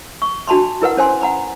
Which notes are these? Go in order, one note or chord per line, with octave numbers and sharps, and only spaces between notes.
C#6
D4 F#4 A5 B5 C6
E4 A#4 B4 F#5
C#4 C5 G#5 C6
F#5 A#5 B5